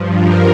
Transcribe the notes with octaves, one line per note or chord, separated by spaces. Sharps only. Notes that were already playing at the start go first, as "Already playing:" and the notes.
Already playing: G2 F3
A#4